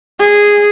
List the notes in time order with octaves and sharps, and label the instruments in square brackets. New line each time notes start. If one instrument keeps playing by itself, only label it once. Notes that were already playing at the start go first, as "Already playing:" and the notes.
[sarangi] G#4